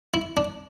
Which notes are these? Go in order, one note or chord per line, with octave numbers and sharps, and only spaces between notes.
E4
D4